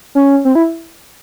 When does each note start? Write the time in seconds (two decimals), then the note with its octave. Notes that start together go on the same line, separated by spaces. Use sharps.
0.15 C#4
0.45 C4
0.55 E4